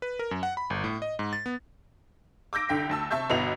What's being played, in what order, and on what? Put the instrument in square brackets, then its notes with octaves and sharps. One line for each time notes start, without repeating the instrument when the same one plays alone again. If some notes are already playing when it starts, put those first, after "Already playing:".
[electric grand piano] B4
A#4
F#2
F#5
B5
G1
A2
D#5
G#2
A6
B3
[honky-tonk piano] D6 E6 G6 A#6 D7
C2 D3 G5 B6
D2 A5 E6
C3 E5 A5 C#6 G6
G1 B2 B3 E4 D#5 F7